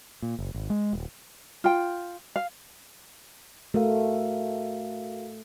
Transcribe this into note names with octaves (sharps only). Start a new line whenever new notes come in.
A#2
F#1
G#1
G#3
D#1
F4 G5
F5
A3 F#4 A#4 F5